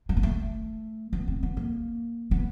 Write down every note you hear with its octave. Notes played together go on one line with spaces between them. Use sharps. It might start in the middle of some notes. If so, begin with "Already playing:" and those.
G#3
A#3
A3
B3
C4
B3
A#3
B3